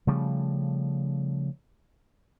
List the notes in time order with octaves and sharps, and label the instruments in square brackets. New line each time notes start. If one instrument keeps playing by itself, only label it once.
[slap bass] C#3 F3 G3 A3